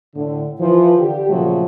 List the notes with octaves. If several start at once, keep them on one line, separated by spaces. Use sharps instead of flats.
A2 D3
E3 F3
D3 G4
A#2 C#3 F3 F#3 A3